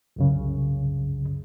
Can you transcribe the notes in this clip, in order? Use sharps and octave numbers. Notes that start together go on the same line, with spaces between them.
C2 F#2 C#3